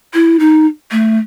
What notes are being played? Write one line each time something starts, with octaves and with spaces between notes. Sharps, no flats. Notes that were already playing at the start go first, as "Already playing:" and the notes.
E4
D#4
A3